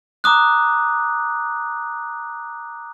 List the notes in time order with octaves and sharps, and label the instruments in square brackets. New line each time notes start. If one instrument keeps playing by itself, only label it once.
[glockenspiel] A#5 D6 D#6 F#6